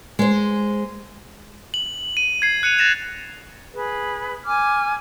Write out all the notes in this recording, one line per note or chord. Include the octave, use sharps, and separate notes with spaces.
G#3 C5
F#7
D#7
G#6 C7
F#6 C#7 D#7 F7
F#6 A6 A#6 E7 F7
G#4 B4
G#5 D6 F6